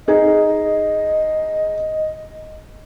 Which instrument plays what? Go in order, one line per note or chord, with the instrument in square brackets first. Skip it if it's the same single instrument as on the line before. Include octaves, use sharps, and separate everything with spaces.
[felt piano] D#4 G#4 [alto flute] D#5